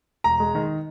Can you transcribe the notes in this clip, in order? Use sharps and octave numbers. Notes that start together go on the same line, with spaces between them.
E1 A#5
G#3
D#3